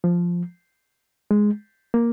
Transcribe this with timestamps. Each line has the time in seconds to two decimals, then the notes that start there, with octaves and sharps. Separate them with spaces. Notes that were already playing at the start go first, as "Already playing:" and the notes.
0.04 F3
1.31 G#3
1.94 A#3